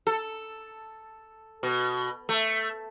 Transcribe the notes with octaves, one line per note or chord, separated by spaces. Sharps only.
A4
B2
A3